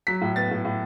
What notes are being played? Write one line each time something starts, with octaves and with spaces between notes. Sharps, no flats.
F#3 B6
A2
B3 A6
A2
A2